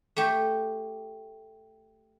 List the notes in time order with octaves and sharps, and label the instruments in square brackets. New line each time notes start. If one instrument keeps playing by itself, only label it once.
[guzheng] A3 G4